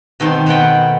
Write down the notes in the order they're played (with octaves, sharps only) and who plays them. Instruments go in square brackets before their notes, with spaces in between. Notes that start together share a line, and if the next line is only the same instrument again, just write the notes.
[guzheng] B2 D#3 A3 C4 G5 C6
B2 B4 F#5 G5